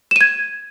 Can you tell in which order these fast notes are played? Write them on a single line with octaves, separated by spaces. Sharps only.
E7 D#7 G#6